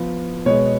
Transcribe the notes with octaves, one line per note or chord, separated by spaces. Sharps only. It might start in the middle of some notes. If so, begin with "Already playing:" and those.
Already playing: F3 B3
B2 G#3 B3 C#5